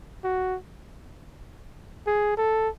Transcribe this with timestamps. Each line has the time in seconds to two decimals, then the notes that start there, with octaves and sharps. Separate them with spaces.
0.25 F#4
2.07 G#4
2.37 A4